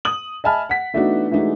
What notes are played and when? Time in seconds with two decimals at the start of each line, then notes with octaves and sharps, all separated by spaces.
0.05 D#6 F#7
0.44 D#5 E5 G#5 A5 B5 F6
0.69 F#5 B6
0.94 E3 A3 B3 D4 D#4 F#4
1.31 E3 G#3 A3 D4 D#4 F#4